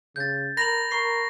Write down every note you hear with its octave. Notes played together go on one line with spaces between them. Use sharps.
C#3 G6 A6
A#4 B5 A#6 F7 F#7
A#4 C#6 C7